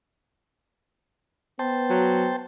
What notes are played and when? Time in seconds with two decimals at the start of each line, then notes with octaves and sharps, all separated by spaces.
1.59 B3 C5 G5 A5
1.90 F#3